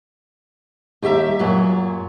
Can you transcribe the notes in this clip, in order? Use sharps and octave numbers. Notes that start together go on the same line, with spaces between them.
D#2 G3 G4 E5 A#5
F#2 A#2 F#3